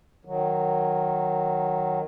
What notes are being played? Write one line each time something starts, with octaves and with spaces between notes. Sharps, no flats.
D#3 F#3